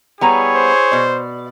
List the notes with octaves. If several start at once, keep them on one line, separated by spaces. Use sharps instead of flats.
G3 B3 E4 G#4 C#5 A#5
C5
B2 D5